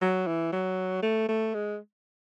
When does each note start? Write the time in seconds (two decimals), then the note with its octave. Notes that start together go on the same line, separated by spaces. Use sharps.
0.02 F#3
0.27 E3
0.52 F#3
1.03 A3
1.29 A3
1.54 G#3